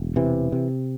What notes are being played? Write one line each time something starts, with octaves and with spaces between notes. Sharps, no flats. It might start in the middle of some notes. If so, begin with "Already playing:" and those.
Already playing: E1
C3 E3
C3